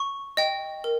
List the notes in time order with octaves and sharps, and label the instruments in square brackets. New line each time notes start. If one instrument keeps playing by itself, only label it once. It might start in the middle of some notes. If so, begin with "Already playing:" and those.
Already playing: [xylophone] C#6
D#5 G5
A#4